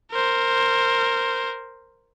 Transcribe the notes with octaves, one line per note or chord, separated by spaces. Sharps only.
A#4 C5